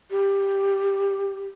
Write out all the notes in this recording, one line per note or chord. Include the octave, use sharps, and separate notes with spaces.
G4